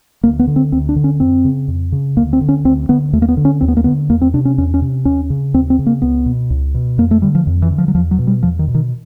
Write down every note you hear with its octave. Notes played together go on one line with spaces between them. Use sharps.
D2 A#3
B3
D3
C4
D2 C4
D4
D3
C#4
F2 C4
C#3
F2
C#3
D2 A#3
C4
D3
C#4
D2 C4
D3 B3
D#2 A3
A#3
B3
D3
C#4
D#2 C4
B3
A#3
D3 B3
E2 A#3
C4
C3 D4
C#4
E2 C#4
C#4
C3
D#2 C#4
C#3
D#2 C4
C4
C#3
A#3
C#2 B3
B2
C#2
B2
F2 A#3
A3
D3 G3
F3
F2
E3
D3
F3
F#3
E2 F3
F#3
B2
G3
E2 F3
D#3
B2
D#3